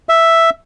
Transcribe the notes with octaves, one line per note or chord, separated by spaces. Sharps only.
E5